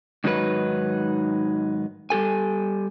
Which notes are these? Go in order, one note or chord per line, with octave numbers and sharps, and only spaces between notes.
G#2 D#3 F#3 D#4 G#4 B4
G3 G4 A4 G#5